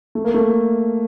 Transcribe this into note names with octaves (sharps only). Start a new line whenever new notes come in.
A3
A#3
A3